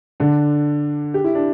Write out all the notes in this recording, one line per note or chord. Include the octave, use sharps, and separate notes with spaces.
D3 D4
G4
E4
D4